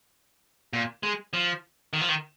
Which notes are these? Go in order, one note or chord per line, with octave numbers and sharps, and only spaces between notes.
A#2
G#3
F3
D#3
F3
D#3